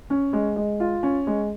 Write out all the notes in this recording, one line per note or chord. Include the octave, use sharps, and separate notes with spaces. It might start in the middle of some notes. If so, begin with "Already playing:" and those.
C#4
G#3
G#3
F4
C#4
G#3